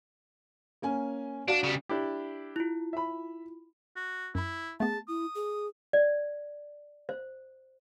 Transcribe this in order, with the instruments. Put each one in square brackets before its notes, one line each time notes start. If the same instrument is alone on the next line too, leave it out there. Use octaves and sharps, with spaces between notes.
[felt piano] A#3 C#4 G#5
[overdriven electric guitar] D4 [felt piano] F#4 D5 F5
[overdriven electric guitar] C#3 G3
[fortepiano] D4 E4 G4
[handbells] E4 F4
[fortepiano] E5 B5
[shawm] F#4
[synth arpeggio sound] F#2 B5 [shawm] E4
[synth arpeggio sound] A3 B3 [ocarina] G#4 [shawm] A5
[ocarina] E4 [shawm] D#6
[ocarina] G#4
[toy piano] D5
C5